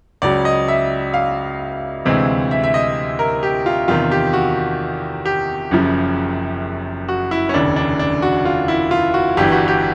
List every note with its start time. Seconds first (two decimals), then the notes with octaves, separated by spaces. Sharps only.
0.22 C#2 C#3 F#3 D5
0.45 D#5
0.68 E5
1.14 F5
2.05 D2 C3 E3 G#3 C4
2.51 E5
2.64 E5
2.74 D#5
3.19 A#4
3.43 G4
3.66 F4
3.88 E2 C3 D#3 F4
4.11 G4
4.33 F#4
5.25 G4
5.71 F#1 F#2 C#3 F3
7.08 F#4
7.31 E4
7.49 C#4
7.54 F1 D#2 C#3 D4
7.76 D4
7.99 D4
8.22 F#4
8.45 F4
8.68 E4
8.91 F4
9.14 F#4
9.37 G1 G2 E3 G4
9.52 F#4
9.68 G4